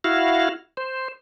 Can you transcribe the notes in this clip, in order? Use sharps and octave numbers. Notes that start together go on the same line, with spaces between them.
E4 F#4 F5
C5